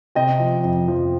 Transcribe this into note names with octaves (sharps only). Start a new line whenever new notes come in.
C3 D#5 G5
F3
F2
F3